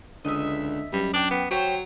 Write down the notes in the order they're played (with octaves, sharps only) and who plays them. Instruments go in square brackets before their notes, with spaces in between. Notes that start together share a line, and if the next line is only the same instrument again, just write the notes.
[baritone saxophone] C#2 [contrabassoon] D3 [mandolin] D#5 E5
[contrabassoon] F#2 [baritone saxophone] G3
[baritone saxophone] D4 [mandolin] G5 D6
[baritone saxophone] B3
[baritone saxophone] F#3 [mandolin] G4 C5 C#5